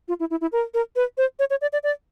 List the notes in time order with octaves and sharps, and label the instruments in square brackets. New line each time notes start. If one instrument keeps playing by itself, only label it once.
[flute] F4
E4
E4
E4
A#4
A#4
B4
C5
C#5
C#5
D5
D5
D5